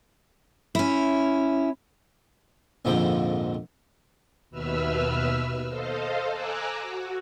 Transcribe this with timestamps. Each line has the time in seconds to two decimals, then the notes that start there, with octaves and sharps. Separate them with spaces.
0.75 C#4 E4
2.85 A#1 F2 G#2 D3 F3 G5
4.50 D#2 B2 B4 E5 E6 F6
5.68 A4 C5 D#5 F5
6.31 G#5 A#5 D6 E6 F#6
6.81 F#4